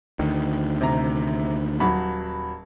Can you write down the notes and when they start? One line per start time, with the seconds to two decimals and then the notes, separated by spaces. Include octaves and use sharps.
0.19 D2 D#3
0.81 C3 A#5
1.80 D#1 F#3 B5